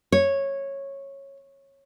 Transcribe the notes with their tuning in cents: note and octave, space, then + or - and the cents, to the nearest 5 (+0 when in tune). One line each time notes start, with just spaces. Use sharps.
C#5 -10